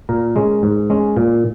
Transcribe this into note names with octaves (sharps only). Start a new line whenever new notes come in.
A#2 A#4
G#3 C#4
G#2
G#3 C#4
A#2